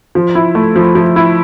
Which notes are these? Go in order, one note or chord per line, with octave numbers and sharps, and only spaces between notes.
F3
E4
A3
F3
F3
E4